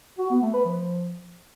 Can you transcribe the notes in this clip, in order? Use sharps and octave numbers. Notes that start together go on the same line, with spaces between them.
F#4
B3
A3
B4
F3